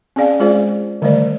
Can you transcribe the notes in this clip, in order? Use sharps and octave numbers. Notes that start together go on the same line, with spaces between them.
C4 C#4 G#4 D5 F5 G#5
G#3 F4 G#4 C5 D5
D3 D#3 G3 A3 C5 D5